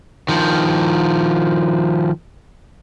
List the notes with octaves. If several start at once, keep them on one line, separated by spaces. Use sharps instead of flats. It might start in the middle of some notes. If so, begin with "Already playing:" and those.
D#3 F3